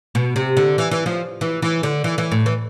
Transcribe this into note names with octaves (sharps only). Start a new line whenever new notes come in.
B2
C3
D3
E3
E3
F3
E3
E3
D3
E3
E3
A2
E3